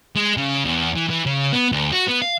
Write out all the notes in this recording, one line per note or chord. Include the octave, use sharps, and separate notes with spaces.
G#3
C#3
E2
E3
E3
C#3
B3
D2
F#4
B3
F5